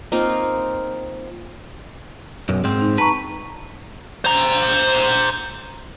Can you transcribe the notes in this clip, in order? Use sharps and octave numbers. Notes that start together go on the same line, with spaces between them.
A#3 C4 D#4 F4
B1 F#2
G#2 C4
D#4
B4 A5 A#5 C#6
C5 A#5